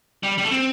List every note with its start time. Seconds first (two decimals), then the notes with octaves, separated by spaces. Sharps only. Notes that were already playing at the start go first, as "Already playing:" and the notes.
0.23 G3
0.38 G3
0.45 A3
0.52 C4